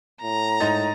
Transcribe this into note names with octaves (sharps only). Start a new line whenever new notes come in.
A2 A#5
G#2 D#4 A6